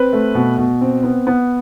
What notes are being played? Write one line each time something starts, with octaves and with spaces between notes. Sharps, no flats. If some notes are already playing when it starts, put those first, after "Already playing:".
Already playing: C4 B4
A3
B2
B2
C4
B3
B3